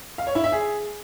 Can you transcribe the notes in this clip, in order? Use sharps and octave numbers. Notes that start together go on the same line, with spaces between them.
F5
C#5
E4
E5
G#4